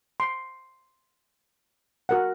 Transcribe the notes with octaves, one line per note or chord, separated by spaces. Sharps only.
C6
F#4 A#4 F#5